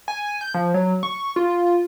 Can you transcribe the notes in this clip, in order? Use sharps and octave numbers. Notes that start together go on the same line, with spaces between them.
G#5
G6
F3
F#3
C#6
F4